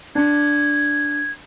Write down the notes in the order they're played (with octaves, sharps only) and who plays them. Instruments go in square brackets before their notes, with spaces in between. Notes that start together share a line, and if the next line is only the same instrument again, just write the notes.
[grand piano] D4 [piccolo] G#6